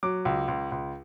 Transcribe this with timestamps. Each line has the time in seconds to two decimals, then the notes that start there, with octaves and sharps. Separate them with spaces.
0.03 F#3 D6
0.25 C#2
0.48 C#2
0.72 C#2